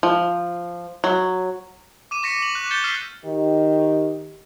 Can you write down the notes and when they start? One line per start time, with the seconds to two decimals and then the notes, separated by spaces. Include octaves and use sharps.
0.03 F3
1.04 F#3
2.11 D6 D#7 E7
2.23 C#6 A#6 B6 C#7
2.42 F#7
2.55 F#6
2.71 G6 A6 C#7 E7 G7
2.84 E6 F6 B6 C7
3.25 D#3 G4